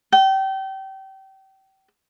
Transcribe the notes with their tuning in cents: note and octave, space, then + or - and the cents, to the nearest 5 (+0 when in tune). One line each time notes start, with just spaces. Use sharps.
G5 -30